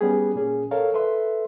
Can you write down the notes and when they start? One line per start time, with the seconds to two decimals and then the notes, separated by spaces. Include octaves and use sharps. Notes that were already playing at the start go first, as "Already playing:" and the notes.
0.01 G3 B3 C#4 G4 G#4
0.35 A#2 A#3 C#4 G#4
0.71 A4 A#4 C#5 F5
0.93 A4 B4 E5 C6